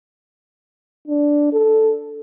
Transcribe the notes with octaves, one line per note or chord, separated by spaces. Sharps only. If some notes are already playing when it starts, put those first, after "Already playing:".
D4
A4